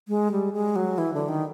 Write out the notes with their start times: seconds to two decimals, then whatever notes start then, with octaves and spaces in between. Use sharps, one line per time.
0.08 G#3
0.32 G3
0.53 G#3
0.76 F#3
0.98 E3
1.14 D3
1.28 D#3